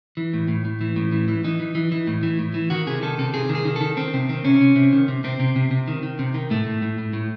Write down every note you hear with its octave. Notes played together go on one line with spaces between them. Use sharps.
E3
A2
A2
A2
E3
A2
E3
E3
E3 D#4
E3
E3
E3
A2
E3
A2
E3
D#3 F#4
C3 G#4
D#3 A4
C3 A4
C3 G#4
D#3
G#4
D#3
D#3 A4
D#3 C4
C3 C4
D#3 C4
C3 C#4
C3
C3
D#3
C3
C3 C4
C3
C3
C3
D#3
D#3
C3
D#3
A2 A3
A2
A2
A2
A2